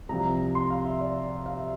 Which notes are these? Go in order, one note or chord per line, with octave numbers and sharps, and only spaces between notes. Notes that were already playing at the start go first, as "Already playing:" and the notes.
C2 C3 F3 A#5
C6
F5
E5
D5
F5
E5